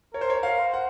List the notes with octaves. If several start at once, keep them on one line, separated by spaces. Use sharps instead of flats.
A#4 C#5
C5
C#5
F5
C5
F#5